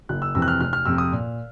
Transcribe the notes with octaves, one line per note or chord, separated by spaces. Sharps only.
F#1 F#6
E6
F2 C3 E3 E6
F#6
F6
F1 F6
F6
F2 C3 E6
D#6
A#2